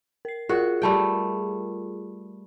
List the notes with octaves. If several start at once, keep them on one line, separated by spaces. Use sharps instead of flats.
A#4 C7
F4 F#4 G#4 A#4
G3 A3 G5